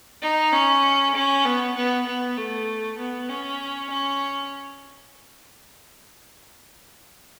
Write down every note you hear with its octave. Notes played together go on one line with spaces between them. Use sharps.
D#4
C#4
C#4
B3
B3
B3
A3
B3
C#4
C#4